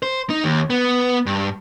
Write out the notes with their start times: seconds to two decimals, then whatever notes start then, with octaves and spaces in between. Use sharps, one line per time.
0.03 C5
0.30 D#4
0.44 D#2
0.70 B3
1.26 G2